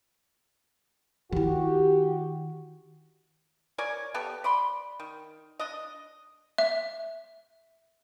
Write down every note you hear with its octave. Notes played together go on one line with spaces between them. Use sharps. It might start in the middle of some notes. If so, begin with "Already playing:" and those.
D#3 E4 F#4 G4
A#4 C#5 D5 G#5
B3 G4 A4
D5 B5 C6
D#3
D4 D#5
E5